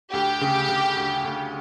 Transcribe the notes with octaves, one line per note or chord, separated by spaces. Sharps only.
D2 G4
C#3
C#3
D2
D2